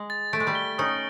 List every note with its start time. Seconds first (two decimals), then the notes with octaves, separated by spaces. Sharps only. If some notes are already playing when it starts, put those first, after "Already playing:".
Already playing: G#3
0.10 A6
0.33 A3 D7
0.40 G#3
0.47 G3 A3
0.55 G7
0.78 C#4 D#4 D#6